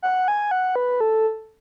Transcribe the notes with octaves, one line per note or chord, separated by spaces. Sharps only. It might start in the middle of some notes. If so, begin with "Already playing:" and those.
F#5
G#5
F#5
B4
A4